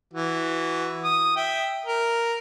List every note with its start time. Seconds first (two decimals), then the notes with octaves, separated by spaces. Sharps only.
0.14 E3 F#4
1.04 D#6
1.36 E5 G5
1.86 A#4